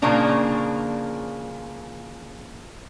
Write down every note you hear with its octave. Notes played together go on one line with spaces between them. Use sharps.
A#2 C#3 F3 A#3 D4 A#5